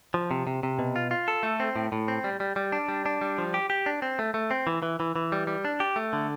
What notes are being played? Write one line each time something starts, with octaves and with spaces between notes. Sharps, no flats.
F3
C3
C3
C3
B2
F4
F4
A4
A3
C4
A2
A2
C4
G3
G3
G3
D4
G3
D4
G3
F3
G4
G4
D4
C4
A3
A3
C4
E3
E3
E3
E3
G3
G3
D4
G4
A3
D3